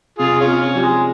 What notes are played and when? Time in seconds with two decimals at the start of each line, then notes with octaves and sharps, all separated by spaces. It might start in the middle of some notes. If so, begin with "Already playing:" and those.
0.19 C3 F4 G#4
0.40 C#4 F4
0.47 C4
0.61 C#4
0.75 F3 G3
0.82 G#3